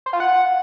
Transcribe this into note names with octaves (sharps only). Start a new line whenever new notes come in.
C5
F4
F#5